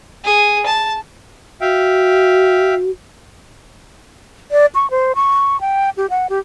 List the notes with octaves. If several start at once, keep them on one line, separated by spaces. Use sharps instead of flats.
G#4
A5
F#4 E5 F5 G5
D5
C#6
C5
C#6
G5
G4
F#5
G4